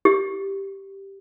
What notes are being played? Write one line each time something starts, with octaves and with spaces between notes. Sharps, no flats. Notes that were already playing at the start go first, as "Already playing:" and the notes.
G4